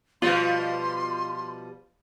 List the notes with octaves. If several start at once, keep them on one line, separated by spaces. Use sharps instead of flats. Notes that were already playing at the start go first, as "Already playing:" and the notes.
B2 F3 G3 F4 C6